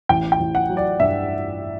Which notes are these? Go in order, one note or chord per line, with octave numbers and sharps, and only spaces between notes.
A1 G5
G5
A1
F#5
F#3
D5
G2 E5